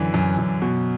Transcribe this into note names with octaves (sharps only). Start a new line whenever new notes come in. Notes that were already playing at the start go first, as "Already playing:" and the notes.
Already playing: F#2 D3 E3 D5
F#2
F#2
B2